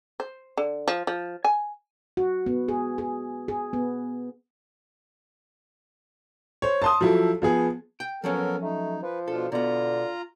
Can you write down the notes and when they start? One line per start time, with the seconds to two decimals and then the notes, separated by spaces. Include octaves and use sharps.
0.20 C5
0.57 D3
0.88 F3
1.07 F3
1.45 G#5
2.17 F#4
2.46 B3
2.68 G#4
2.98 G#4
3.48 G#4
3.73 B3
6.62 C5 C#5
6.82 A5 C6 D#6
7.01 F3 F#3 E4 F#4 A4
7.42 F3 B3 G#4
8.00 G5
8.24 F3 F#3 B3 C#4 A4 A#4
8.62 A3 D#4
9.03 F3 B4
9.28 B2 D4 F4 A4
9.52 B2 D3 B3 F4 A#5